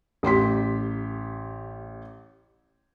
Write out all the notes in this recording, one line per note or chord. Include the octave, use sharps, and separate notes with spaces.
A1 G4 C6 B6